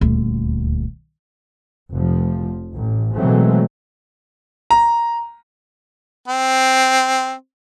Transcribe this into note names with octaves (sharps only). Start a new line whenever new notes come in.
D#1 D2
F1 F3
A1
B2 E3 F#3 G#3 A3 C4
A#5
C4